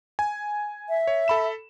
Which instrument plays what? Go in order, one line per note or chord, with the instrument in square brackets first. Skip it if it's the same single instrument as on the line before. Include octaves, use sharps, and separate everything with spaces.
[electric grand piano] G#5
[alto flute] E5
[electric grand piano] C#5
A4 B5 E7